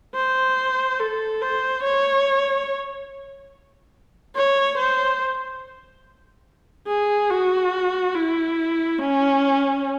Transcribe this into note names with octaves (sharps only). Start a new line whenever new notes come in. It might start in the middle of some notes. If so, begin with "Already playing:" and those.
C5
A4
C5
C#5
C#5
C5
G#4
F#4
E4
C#4